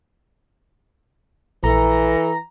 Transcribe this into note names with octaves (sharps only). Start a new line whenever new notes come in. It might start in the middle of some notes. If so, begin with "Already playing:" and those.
A#1 E3 A4 A#5